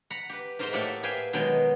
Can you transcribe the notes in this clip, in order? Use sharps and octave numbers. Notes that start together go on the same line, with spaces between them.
F#5 A#5 B5
G4 B4
G#2 A#4 C5 D#5 E5 C6
A2 A#3 G4 A4 F#5 B5
G#4 B4 E5 F5 G5 G#5
B2 D#3 F#3 G#3 B3 G5